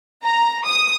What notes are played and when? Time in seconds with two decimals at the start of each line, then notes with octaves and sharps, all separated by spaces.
0.23 A#5
0.65 D#6